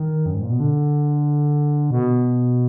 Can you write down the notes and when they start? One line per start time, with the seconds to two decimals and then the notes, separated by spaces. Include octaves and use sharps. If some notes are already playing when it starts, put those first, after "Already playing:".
Already playing: D#3
0.26 F#2
0.35 G#2
0.43 A#2
0.50 B2
0.60 D3
1.90 B2